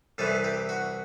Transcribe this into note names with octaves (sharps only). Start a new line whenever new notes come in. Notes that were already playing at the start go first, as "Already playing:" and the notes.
C2 C3 E3 A4
G4
F#4